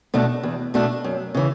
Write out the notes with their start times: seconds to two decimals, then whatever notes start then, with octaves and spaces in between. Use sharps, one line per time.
0.14 B2 A3 D4
0.43 E2
0.74 B2 A3 D4
1.04 F#2
1.35 C#3 E3